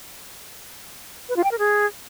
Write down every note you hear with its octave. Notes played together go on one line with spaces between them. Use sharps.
B4
F4
G5
A#4
G#4